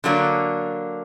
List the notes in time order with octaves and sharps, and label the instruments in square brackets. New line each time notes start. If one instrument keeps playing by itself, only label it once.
[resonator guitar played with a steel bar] D3 F#3 A#3 D4